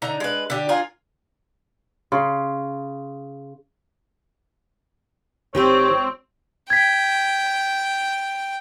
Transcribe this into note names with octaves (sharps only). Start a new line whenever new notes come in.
D3 D#4 A#5
G#3 B4
D3 G4
F4 G#4 A#4
C#3 C6
G#1 D#3 C4 G4 B4 C#5
G5 G#6 B6